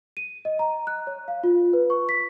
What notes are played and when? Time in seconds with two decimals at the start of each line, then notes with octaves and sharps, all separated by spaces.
0.17 D#7
0.45 D#5
0.59 A#5
0.87 F#6
1.07 C#5
1.28 F5
1.44 F4
1.73 B4
1.90 C#6
2.09 B6